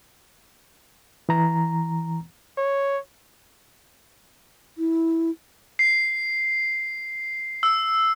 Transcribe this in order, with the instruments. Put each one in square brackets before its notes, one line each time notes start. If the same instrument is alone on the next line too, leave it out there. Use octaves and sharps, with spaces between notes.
[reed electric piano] E3 A#5
[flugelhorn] C#5
[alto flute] E4
[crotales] C7
E6